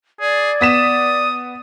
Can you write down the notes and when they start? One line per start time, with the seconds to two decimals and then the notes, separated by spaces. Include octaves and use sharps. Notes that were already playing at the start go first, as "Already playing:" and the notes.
0.20 G#4 D5
0.61 B3 D#6 B6 E7